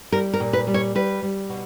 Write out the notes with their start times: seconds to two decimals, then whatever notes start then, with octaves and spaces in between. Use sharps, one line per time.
0.12 G3 A#4
0.34 A#4
0.40 A#2
0.53 B4
0.67 G3
0.74 C#5
0.95 G3 B4
1.22 G3
1.49 B2